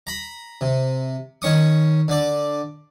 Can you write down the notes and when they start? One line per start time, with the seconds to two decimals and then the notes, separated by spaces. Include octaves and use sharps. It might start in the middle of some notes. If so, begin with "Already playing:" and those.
0.07 A#5 B5
0.61 C3
1.42 D#3 C#4 C#6 D#6
2.08 D3 D5